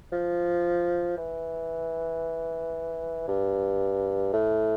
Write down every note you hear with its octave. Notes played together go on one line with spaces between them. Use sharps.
F3
E3
G2
A2